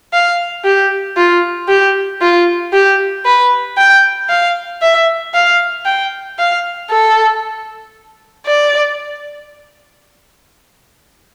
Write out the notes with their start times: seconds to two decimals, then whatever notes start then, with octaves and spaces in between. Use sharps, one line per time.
0.13 F5
0.64 G4
1.17 F4
1.68 G4
2.21 F4
2.73 G4
3.25 B4
3.77 G5
4.29 F5
4.82 E5
5.34 F5
5.85 G5
6.38 F5
6.91 A4
8.46 D5